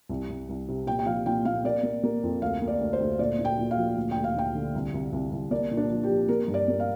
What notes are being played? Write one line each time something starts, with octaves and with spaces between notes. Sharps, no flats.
C2
C2
C2
C3
A#2 G5
G5
F3 F5
A#2 G5
A#2 F5
A#3 D5
A#3
A#3
F2
D2 F5
A#3
D5
D2
C5
D2
A#2 D5
A#2
G5
A#2
F5
F3
D2
D2 G5
F5
D2 G5
D3
C2
C2
C2
C2
A#3 D5
A#2
D4
F3
G4
F3
A#3 A#4
G2
D5
A#3
F5